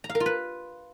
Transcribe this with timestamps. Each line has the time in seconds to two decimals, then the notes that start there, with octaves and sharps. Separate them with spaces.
0.04 A#5
0.09 F5
0.15 A#4
0.20 F4
0.26 B4